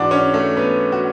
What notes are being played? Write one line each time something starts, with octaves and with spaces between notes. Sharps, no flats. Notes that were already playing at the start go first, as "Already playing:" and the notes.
Already playing: G#2 E3 D4 F#4 D5 F#5
C#4 C#5
A3 A4
B3 B4
F#4